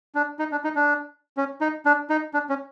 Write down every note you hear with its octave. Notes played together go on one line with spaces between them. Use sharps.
D4
D#4
D4
D#4
D4
C#4
D#4
D4
D#4
D4
C#4